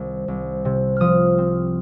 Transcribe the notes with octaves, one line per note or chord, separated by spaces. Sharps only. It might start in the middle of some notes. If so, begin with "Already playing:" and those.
Already playing: C2 D#3
C2
C3
F3 D#6 F6
C4